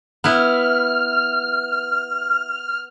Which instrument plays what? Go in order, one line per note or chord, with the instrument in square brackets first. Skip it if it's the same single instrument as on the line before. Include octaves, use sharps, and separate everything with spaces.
[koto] B3 E4 [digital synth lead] F6